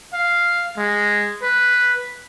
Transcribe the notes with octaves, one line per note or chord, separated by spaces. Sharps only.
F5
G#3
B4